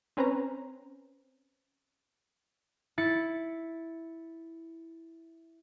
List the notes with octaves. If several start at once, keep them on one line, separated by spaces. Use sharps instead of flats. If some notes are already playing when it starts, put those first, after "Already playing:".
C4 C#4 B4 C5 A#5
E4 A6 C#7